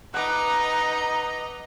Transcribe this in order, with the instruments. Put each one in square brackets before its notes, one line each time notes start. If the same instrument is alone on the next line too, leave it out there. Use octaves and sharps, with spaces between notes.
[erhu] D#4 [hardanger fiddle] B4 A#5 [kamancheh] D#5 [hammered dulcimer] F#5 D6